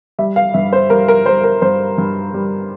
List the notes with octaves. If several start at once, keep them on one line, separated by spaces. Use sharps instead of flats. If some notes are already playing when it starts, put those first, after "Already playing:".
G3 E5
F5
G2 E5
C5
G3 A#4
A#4
G3 C5
A#4
G2 C5
G2
G3